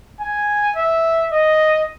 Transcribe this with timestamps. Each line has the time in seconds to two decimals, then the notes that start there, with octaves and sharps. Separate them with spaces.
0.20 G#5
0.76 E5
1.31 D#5